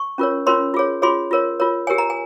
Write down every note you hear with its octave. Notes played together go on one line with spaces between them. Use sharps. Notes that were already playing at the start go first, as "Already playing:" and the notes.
Already playing: C#6
C#4 F4 A#4 C#5
C#4 F4 A#4 C#5 C6
F4 G#4 C#5
F4 G#4 C#5 C6
F4 A#4 C#5
F4 A#4 C#5
G4 A#4 C#5 G#5
A#5
G#5